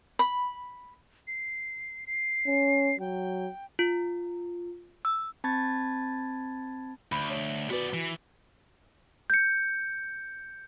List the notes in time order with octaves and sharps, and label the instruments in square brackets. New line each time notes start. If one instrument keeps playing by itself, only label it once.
[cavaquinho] B5
[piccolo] C7
C7
[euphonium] C#4
[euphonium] F#3 [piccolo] G5
[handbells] F4
E6
[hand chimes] C4 A5 B5 G#6 A6
[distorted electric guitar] D2 [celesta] B5
[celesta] C#5
[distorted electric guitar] B3 D5 [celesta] F#4 B4
[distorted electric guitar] E3
[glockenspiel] G6 C#7